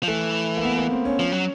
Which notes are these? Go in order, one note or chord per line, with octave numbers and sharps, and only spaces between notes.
F3
E3 A3
A#3
B3
A#3
C4
C#4
F3
F#3